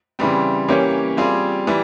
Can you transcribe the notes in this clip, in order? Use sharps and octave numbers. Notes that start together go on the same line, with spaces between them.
C#3 E3 G3 C4
E3 A#3 C#4 G4 C#5
G3 C4 F4 G#4
E3 G3